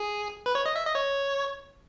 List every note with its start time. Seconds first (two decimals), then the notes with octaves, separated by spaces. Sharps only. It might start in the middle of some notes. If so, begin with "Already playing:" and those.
Already playing: G#4
0.46 B4
0.55 C#5
0.66 D#5
0.76 E5
0.86 D#5
0.95 C#5